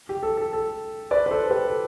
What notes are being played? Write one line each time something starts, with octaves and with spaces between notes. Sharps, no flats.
G4
A4
A4
A4
B4 D5
B4
A4 C5
G4 B4
A4